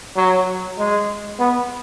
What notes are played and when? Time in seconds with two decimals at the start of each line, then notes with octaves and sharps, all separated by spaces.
0.17 F#3
0.78 G#3
1.40 B3